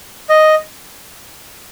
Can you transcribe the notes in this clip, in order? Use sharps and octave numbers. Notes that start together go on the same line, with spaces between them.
D#5